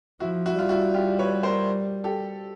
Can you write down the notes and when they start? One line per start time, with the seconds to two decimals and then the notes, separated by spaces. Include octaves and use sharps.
0.20 F3 E4 F#4
0.46 E4 F#4
0.58 G3 F4
0.69 E4 F#4
0.94 F4 G4
1.19 B4 C#5
1.43 A#4 C5
2.04 G4 A4